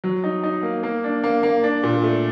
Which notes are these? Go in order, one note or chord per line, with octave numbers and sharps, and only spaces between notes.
F#3
D#4
D#4
A#3
A#3
D4
A#3
A#3
D4
A#2
A3